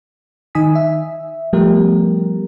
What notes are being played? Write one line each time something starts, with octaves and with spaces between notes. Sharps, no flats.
D#3 D#4 G#5 D#6 B6
E5
F3 G3 A3 B3 G4 A#4